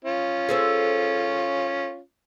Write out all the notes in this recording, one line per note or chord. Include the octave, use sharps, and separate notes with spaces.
C#4 F4
G#4 A4 C5